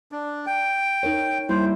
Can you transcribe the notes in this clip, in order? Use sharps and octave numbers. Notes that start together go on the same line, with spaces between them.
D4
G5
D#4 A#4 C#5
G3 A#3 E4 C5